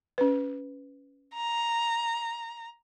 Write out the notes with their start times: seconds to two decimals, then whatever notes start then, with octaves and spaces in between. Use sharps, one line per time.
0.18 C#4 B4
1.34 A#5